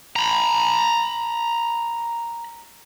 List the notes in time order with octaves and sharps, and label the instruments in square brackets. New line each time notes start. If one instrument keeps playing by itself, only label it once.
[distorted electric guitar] A#5 B5